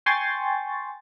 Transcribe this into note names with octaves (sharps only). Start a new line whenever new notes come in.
G5 G#5 C6 C#6 A6